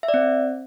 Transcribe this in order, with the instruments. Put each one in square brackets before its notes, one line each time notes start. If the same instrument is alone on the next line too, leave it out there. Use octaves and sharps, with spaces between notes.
[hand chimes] E5
D5
C4